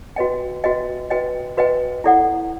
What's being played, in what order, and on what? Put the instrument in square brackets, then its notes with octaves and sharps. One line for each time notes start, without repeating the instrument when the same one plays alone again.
[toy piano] F#4 B4 D#5 G5
F#4 B4 D#5 G5
F#4 B4 D#5 G5
F#4 B4 D#5 G5
E4 A4 D5 F#5